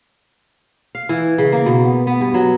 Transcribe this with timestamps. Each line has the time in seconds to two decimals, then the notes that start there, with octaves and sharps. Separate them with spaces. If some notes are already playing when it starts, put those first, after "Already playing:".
0.95 F5
1.09 E3
1.38 C#3
1.52 A#3
1.66 B2
1.84 B3
2.07 B3
2.21 G2
2.34 F#3